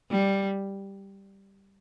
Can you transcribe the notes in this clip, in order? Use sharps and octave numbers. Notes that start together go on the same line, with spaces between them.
G3